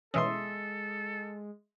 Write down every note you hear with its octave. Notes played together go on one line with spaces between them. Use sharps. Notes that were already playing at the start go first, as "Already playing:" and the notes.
B2 E3 G#3 C#4 A4 D#5 E5 C6